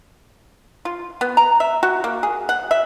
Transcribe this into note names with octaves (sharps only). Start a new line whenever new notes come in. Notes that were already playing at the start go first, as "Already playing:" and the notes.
F4
B3
A#5
E5
F#4
A#3
G#4
F#5
E5